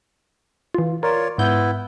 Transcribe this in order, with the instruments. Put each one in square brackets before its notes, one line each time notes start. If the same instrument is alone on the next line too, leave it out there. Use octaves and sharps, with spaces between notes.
[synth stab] E3 F4
[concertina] F4 C#5 D5 [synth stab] A#4
[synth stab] G#2 G6 [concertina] B3 E4